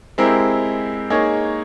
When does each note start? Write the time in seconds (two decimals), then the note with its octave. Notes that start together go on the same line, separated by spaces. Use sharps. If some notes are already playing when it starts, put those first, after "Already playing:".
0.18 G#3 C4 E4 G4 A#4
1.10 A#3 D#4 G#4 C#5